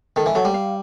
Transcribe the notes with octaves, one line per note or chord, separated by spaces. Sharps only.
D#3 A4
E3
F#3 A4
G3
F5